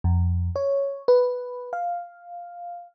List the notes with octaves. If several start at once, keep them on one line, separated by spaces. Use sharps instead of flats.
F2
C#5
B4
F5